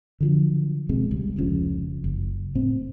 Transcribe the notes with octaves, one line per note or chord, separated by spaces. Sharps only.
D3 F3 F#3
C#2 B2 G#3 C4
C#2 G3
F1 C#2 C#3 F3
F#1
A2 C4